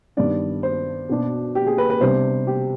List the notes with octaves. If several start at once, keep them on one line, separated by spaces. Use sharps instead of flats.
G2 D#3 G3 B3 D4 D5
C5
B2 B3 D4
G4
G#4
B4
B4
C3 G3 B3 D4 C5
G4